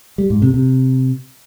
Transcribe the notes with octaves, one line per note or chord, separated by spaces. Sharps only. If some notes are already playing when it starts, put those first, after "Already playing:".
G3
G#2
C3
C3